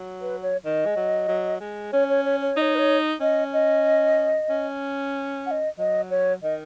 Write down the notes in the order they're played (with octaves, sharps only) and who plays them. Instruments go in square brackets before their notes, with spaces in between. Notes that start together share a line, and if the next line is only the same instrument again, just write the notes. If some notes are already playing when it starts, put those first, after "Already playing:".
Already playing: [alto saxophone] F#3
[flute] B4
C#5
[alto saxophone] D#3 [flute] D#5
[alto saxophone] G#3
F#3
F#3
G#3
[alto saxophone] C#4 [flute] C#5
[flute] C#5
C#5
C#5
[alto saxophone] D#4 [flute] D#5
[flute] C#5
B4
C#5
[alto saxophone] C#4 [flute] D#5
[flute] D#5
[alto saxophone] C#4
[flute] F#5
D#5
[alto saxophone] F#3 [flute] D#5
[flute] C#5
[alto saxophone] D#3 [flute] D#5